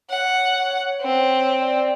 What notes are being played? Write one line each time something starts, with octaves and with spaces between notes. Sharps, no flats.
C#5 F#5
C4
D5